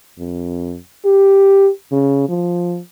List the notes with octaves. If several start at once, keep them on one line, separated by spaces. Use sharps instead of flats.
F2
G4
C#3
F3